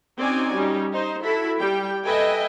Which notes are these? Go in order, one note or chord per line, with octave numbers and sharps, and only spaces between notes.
C4 C#4 D#4 F#4 D5 G#5
G3 C#4 D#4
D#4 C5
E4 F#4 A4 B5
G3 G5
A4 B4 D#5 E5 G5 G#5